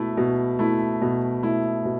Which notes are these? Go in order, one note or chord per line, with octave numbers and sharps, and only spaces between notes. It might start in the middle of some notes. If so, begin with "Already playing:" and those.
Already playing: B2 A3 E4
B2
A3 E4
B2
A3 E4
B2